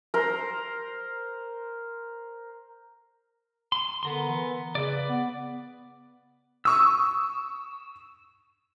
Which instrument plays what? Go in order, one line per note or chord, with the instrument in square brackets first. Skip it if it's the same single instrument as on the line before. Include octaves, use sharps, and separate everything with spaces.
[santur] A#4 C5
[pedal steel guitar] C6
[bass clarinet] D3 [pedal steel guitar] B3 A#4 C6
[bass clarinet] E3
[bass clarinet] C#3 [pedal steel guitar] B4 D5
[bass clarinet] B3
[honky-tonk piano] C#6 D#6 [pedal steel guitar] E6